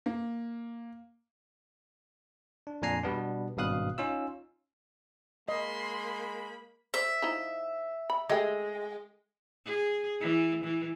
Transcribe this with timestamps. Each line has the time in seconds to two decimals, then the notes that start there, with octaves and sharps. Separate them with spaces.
0.06 A#3
2.67 D4
2.82 F2 A#2 D4 G#5 A#5 C7
3.03 B2 G3 B3 D4
3.57 G#1 G2 B2 F5 D#6 F#6
3.98 C#4 D#4 F4 E6
5.49 G#3 A#3 D#5 B5 C6
6.94 C5 D5 E5
7.22 F3 D#4 E4
8.10 B5
8.30 G#3 A3 G4 G5
9.65 G#4
10.20 E3
10.64 E3